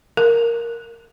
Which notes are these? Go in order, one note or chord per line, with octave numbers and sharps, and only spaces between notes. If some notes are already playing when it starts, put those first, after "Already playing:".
A#4